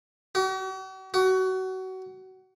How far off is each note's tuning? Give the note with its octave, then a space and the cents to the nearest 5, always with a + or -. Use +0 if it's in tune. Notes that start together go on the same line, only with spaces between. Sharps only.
F#4 +45
F#4 +25